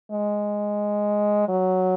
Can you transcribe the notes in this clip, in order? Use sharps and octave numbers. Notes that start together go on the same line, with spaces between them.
G#3
F#3